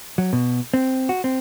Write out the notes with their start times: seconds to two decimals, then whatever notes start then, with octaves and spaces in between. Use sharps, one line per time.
0.18 F#3
0.33 B2
0.74 C4
1.09 F#4
1.24 C4